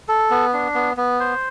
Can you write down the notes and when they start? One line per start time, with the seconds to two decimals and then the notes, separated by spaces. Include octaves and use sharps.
0.09 A4
0.31 B3
0.53 D4
0.74 B3
0.97 B3
1.20 C5